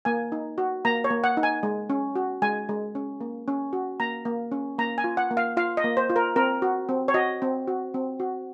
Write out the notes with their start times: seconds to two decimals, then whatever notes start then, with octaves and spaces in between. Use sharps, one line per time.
0.05 A#3 G#5
0.32 D#4
0.58 F#4
0.85 A#3 A#5
1.04 C#5
1.10 A#3
1.24 F#5
1.37 D#4
1.43 G#5
1.63 G#3
1.90 C#4
2.16 F#4
2.42 G#3 G#5
2.69 G#3
2.95 C#4
3.21 A#3
3.48 C#4
3.73 F#4
4.00 A#3 A#5
4.25 A#3
4.52 C#4
4.78 A#3 A#5
4.98 G#5
5.04 F4
5.17 F#5
5.31 A#3
5.37 F5
5.57 F4 F5
5.77 D#5
5.84 A#3
5.97 C5
6.10 F4
6.16 A#4
6.36 C4 A#4
6.62 F#4
6.89 C4
7.08 C#5
7.14 F#4 D#5
7.42 C4
7.68 F#4
7.94 C4
8.20 F#4